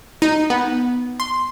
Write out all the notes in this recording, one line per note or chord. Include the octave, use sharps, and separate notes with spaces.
D#4
B3
C6